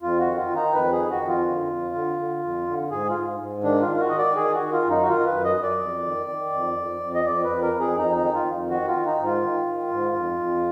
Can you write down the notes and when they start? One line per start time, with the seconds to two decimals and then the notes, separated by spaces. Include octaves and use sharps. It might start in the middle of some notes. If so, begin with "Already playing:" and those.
0.02 F2 F4
0.20 F#4
0.26 D#3
0.37 F4
0.50 D#3
0.56 D#4
0.74 F2 B4
0.92 G#4
0.98 D#3
1.11 F#4
1.22 F2
1.28 F4
1.47 D3
1.71 F2
1.95 D3
2.19 D3
2.44 F2
2.67 D3
2.91 G#2 G#4
3.09 F4
3.15 G#2
3.39 G#2
3.63 D#3 D4
3.82 F4
3.88 D#3
3.96 F4
4.00 F#4
4.09 D#3 D#5
4.18 D5
4.36 D#3 G#4
4.54 F#4
4.60 D#3
4.72 F4
4.85 F#2
4.90 D#4
5.03 F#4
5.08 D#3 F4
5.26 B4
5.32 F#2
5.44 D#5
5.57 F#2
5.63 D5
5.81 F2
6.05 D#3
6.29 D#3
6.53 F2
6.77 F2
7.01 F2
7.14 D#5
7.25 F2 D5
7.44 B4
7.49 F2
7.62 A#4
7.73 F2
7.80 G#4
7.98 F2 D#4
8.16 D#4
8.21 D#3
8.34 F4
8.46 F2
8.70 D#3 F#4
8.88 F4
8.94 D#3
9.06 D#4
9.19 G#2
9.25 F4
9.42 D#3
9.67 D#3
9.91 G#2
10.16 F2
10.40 F2